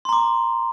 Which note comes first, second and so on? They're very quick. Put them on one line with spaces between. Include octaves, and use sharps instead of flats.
C6 A#5 D6